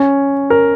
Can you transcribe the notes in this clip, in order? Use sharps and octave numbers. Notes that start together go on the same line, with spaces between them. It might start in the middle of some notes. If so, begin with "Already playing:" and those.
Already playing: C#4
A#4